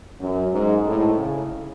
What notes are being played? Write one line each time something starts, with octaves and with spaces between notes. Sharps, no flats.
F#2
G#2
A2
C#3